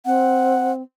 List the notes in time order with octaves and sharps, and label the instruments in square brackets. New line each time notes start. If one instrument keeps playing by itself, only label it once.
[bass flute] C4 [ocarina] F#5